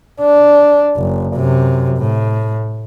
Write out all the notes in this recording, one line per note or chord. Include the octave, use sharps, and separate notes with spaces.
D4
F#1
F#2 C3
A2